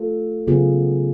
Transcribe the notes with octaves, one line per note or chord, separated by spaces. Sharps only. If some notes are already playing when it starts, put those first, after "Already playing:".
Already playing: A3 F4 A4
C#3 F#3 B3 F4 G#4